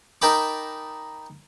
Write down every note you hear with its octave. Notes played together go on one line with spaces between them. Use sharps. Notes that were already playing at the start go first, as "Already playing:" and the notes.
D#4 A#4 G5 A5 B5 D6